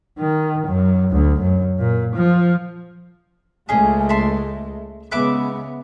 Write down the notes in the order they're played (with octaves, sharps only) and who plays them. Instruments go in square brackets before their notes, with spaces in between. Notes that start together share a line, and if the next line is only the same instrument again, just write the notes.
[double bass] D#3
F#2
D2
F#2
A#2
F3
[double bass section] C#2 G#3 A3 [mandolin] C#4 G#4
[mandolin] E5 A5 C6
[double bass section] C#3 G#3 B3 [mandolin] B4 E5 D6